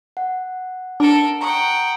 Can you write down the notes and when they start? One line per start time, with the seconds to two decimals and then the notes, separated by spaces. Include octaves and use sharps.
0.17 F#5
1.00 D4 A4 A#4
1.41 F#5 G5 A#5 C#6 D#6